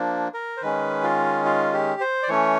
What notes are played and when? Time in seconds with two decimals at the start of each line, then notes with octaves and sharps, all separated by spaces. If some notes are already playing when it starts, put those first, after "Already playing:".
Already playing: F3 A#3 D4
0.34 A#4
0.57 C5
0.62 D#3 G#3 C#4 B4
1.03 F4
1.45 F4
1.73 G4
2.00 C5
2.23 D5
2.28 E3 A3 C#4 C#5